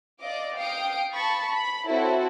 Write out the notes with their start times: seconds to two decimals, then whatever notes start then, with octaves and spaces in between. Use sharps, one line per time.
0.20 D5 D#5 F5 D6
0.57 F5 G5 D#6 C7 D7
1.12 A5 B5 C#6 A6
1.48 B5
1.88 C4 E4 F#4 A4 C5 C#5